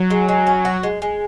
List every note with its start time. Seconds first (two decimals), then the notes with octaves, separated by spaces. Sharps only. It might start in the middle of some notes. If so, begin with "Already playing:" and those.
Already playing: F#3
0.10 G#3
0.29 G#3
0.47 C#4
0.65 F#4
0.83 G#3
1.02 G#3